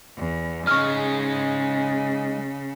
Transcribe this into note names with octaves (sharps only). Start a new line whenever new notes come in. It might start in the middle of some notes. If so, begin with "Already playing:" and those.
E2
C#3 G#3 D#4 C#6 F6